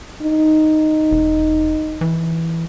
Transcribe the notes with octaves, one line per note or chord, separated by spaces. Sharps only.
D#4
E1
E3